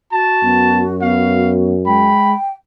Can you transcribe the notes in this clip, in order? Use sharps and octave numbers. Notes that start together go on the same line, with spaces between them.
F#4 A5
F#2 B3
B3 F5
G#3 G5 B5